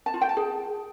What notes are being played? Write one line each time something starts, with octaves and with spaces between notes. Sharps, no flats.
A5
F4
G5
A5
G#4